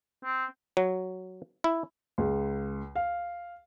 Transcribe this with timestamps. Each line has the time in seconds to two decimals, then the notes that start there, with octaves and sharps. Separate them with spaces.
0.25 C4
0.77 F#3
1.64 E4
2.18 C#2
2.96 F5